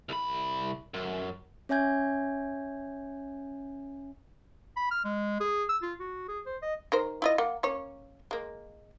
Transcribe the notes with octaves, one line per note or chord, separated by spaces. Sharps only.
C2 B5
F#2
C#4 C#5 E5 G#5 G6 G#6
B5
F6
G#3
G#4
E6
F4
F#4
G#4
C5
D#5
D#3 A#4 C5
E4 F4 D#5
A#3 F#5
A#3 C#4 C#5
G#3 A#3